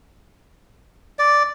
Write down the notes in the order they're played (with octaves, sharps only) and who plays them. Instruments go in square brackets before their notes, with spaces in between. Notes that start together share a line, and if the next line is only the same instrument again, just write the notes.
[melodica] D5